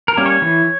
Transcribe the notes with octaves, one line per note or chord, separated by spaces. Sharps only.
A#4
G3 A#3 C#4
C#5
E3